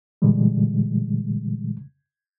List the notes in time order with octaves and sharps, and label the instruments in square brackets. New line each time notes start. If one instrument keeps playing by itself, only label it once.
[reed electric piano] A#2 D3 E3 G3 G#3